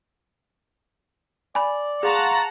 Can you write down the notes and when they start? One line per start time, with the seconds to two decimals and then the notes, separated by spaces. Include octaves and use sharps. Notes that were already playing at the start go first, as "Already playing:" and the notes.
1.55 D5 G#5 B5
2.03 G#4 F5 F#5 A5 A#5 C6 C#6